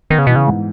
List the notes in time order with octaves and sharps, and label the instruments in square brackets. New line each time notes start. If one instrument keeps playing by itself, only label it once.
[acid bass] D#3 [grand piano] B3
[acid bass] C#3
[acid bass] B2 [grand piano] E3
[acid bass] C#3
[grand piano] G#2